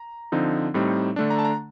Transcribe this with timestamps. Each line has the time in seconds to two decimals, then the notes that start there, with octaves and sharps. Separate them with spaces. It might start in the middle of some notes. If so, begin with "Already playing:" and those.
Already playing: A#5
0.32 D3 F3 C4 D#4
0.74 A2 G3 C4 D#4
1.16 D3 A3 D4
1.30 A#5
1.39 A5
1.45 A#5